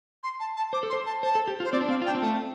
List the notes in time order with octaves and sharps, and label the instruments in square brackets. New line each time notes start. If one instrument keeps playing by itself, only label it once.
[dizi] C6
A5
A5
[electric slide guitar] C5 [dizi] D6
[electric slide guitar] A4
[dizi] C6
[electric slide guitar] C5
[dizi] A5
[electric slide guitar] C5 [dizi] A5
[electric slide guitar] A4
G4
F4
[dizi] C5
[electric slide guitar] C4 [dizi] D5
[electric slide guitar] D4
[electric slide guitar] C4 [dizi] F5
[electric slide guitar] F4
[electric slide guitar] D4 [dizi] G5
[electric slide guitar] C4
[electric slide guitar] A3 [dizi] A5